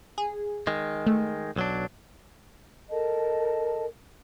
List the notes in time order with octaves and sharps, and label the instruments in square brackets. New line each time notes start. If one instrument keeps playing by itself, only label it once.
[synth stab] G#4
[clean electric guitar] D#3 G#3
[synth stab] A3
[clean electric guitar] B1 F#3 D4
[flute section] A4 A#4 D#5 A5